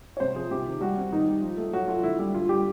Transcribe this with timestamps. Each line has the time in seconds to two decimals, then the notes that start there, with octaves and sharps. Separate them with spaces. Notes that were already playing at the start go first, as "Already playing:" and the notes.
0.17 C#5
0.20 C3 C5
0.35 F3 G#4
0.51 C3 G4
0.67 D#3
0.81 G3 F#4
0.97 C4
1.12 D#3 D#4
1.27 G3
1.42 F3
1.57 A3
1.73 F#3 F#4
1.88 A3 F4
2.03 D3 E4
2.19 G3
2.34 D3 F4
2.49 G3 G4